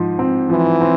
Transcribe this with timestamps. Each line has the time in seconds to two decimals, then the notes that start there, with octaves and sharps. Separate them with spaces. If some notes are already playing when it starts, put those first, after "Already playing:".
Already playing: G#2 F3
0.19 C4
0.50 E3 F3
0.81 C4